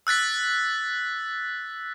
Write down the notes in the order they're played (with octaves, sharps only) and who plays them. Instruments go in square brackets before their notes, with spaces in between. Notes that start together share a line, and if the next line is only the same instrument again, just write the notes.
[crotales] E6 F#6 A6 B6